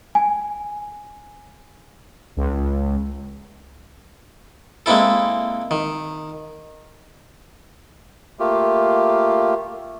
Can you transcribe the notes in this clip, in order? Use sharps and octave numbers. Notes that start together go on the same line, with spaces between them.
G#5
C#2
G#3 A#3 C4 E4 A4
D#3
A3 A#3 F4 G4